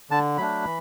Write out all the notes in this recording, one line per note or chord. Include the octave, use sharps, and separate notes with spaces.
D3 A5
F#3 A3 D4 B5
E3